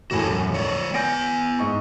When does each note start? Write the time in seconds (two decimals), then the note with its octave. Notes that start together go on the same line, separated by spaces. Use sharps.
0.11 E1 A2 F#4 G4 A4 G#5
0.30 F#2
0.52 F3 C#5 D5
0.94 B3 G#5 G6 A#6 D7
1.59 G#2 D#5 C#6